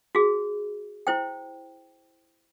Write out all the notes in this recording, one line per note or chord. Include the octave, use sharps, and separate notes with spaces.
F#4 G#4
E4 C5 G5